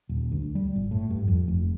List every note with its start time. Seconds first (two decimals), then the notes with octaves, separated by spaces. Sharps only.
0.09 D#1
0.31 D2
0.55 G3
0.76 G1
0.91 A2
1.10 G2
1.28 F2
1.48 F1